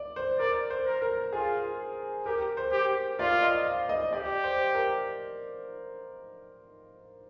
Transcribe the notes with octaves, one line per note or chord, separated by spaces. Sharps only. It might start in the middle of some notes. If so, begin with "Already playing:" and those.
Already playing: D5
C5
A#4 D5
C5
A#4
A#4
F4 G#4
G4 A#4
C5
G4
F4 D5
D#5
F5
D#5
G4 D5
C5
A#4